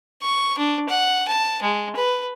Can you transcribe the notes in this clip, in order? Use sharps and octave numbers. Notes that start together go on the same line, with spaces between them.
C#6
D4
F#5
A5
G#3
B4